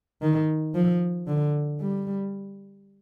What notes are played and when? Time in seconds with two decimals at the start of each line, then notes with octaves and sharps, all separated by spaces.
0.22 D#3
0.75 F3
1.27 D3
1.81 G3